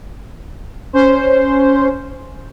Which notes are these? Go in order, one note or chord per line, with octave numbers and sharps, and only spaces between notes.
C#4 C5